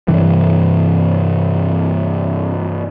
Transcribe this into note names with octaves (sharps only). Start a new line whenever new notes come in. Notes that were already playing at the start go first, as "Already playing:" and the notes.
G2 C3 E3 G3